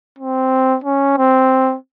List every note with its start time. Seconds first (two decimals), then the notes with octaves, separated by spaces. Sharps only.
0.19 C4
0.84 C#4
1.17 C4